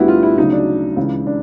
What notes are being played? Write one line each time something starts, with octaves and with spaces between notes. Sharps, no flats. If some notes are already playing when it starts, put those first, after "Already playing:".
Already playing: D2 D3 G3 B3 E4 F#4
F4
E4
D2 C#3 F#3 D#4
D4
C#2 C#3 E3
D4